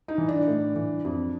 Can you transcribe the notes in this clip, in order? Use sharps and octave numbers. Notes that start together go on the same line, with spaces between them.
D#4
E3
D4
A2
E3
F2